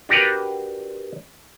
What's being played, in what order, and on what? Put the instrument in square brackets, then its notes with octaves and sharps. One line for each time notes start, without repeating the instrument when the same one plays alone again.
[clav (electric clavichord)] D4 F#4 G4 A#4 B4